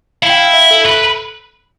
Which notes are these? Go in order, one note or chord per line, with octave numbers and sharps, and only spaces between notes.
E4 F5
G5
F5
E5
A4
B4